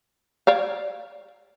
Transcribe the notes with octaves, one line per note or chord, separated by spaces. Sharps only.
C#5 D5 F5